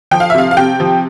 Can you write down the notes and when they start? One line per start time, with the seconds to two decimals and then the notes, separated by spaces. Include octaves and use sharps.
0.11 F3 G5
0.20 F5
0.30 E5
0.35 C3 F5
0.51 F5
0.57 C3 G5
0.80 F3